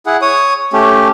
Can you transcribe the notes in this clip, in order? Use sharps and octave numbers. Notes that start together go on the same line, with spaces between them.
E4 G#4 F#5
C#5 D#6
A3 C#4 G4